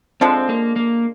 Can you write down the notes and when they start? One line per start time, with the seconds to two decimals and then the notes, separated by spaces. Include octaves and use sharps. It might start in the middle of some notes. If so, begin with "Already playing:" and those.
0.21 D3 F3 G#3 C4
0.49 A#3
0.76 A#3